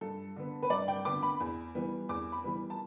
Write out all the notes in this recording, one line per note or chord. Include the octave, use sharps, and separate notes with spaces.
G2 A4
D3 B3
B4
G2 D5
G5
D3 B3 D6
B5
E2
E3 G3 B3
E2 D6
B5
E3 G3 B3
A5